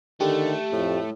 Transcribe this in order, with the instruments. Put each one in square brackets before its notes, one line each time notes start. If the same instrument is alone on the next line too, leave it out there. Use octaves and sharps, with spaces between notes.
[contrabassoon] D3 [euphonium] D#3 [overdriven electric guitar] A3 [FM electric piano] G4
[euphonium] F2 [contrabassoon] A2